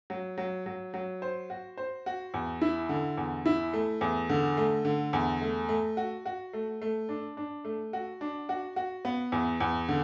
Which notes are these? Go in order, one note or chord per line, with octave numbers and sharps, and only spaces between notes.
F#3
F#3
F#3
F#3
C5
F#4
C5
F#4
E2
E4
D3
E2
E4
A3
E2
D3
A3
D3
E2
A3
A3
F#4
F#4
A3
A3
D4
D4
A3
F#4
D4
F#4
F#4
B3
E2
E2
D3